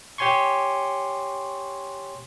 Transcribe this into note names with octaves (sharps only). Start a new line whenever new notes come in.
G4 C#5 G#5 C6 C#6